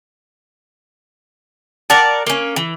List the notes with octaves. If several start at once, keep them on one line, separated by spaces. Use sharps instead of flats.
A#4 D5 F#5 A5
A#3 C#4
E3